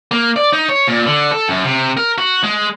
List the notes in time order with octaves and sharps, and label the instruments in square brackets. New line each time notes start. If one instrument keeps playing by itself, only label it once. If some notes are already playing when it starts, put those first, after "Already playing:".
[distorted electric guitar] A#3
D5
D#4
C#5
A#2
D3
A4
F#2
C3
A#4
F#4
G#3